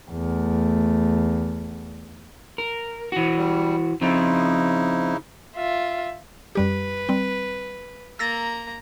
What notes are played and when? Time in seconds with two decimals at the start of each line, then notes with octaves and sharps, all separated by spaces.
0.11 E2 A3
2.58 A#4
3.12 E3 F#4
3.37 G3
4.01 C#3 F3 C4 D#4 E4
5.55 F4 E5
6.55 F#2 G3 G4 B4
7.09 G3 C4
8.19 A#3 A#5 E6 A6 A#6